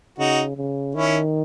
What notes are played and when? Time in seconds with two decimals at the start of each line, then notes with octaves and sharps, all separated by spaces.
0.18 C#3 D#4 F#4
0.57 C#3
0.95 D#3 C#4 E4